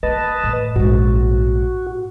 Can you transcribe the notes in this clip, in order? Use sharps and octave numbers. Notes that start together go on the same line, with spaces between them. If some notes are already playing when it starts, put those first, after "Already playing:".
A#3 B4 D#5 A5
A2
A#1 G#2 F#4